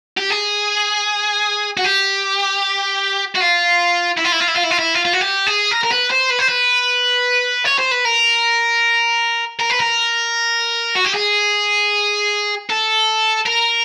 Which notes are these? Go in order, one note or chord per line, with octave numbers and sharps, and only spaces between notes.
G4
G#4
F#4
G4
F#4
F4
E4
F4
E4
F4
E4
F4
E4
F4
E4
F4
F4
F#4
G4
G#4
A#4
A#4
B4
C5
B4
C5
B4
C#5
C5
B4
A#4
A#4
B4
A#4
F#4
G4
G#4
A4
A#4